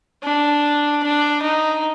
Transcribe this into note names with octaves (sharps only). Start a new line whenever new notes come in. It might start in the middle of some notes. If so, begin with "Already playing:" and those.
D4
D4
D#4